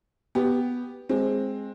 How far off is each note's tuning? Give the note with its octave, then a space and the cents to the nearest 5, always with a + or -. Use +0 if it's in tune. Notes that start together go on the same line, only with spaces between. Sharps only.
B3 +0 G4 +0
G#3 +0 C4 +10